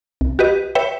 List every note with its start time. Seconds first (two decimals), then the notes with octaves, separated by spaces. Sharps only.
0.21 C2
0.39 F#4 G4 B4 D#5
0.75 B4 C#5 E5 G5